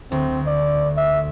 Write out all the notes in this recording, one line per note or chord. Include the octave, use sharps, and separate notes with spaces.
D2 C4
D5
E5